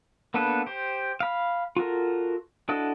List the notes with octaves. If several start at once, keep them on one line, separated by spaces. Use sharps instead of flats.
A#3 B3 D4 A4 B4
G4 C5
F5 B5
F4 F#4 A4 A#4
D4 E4 F#4 A4 D#5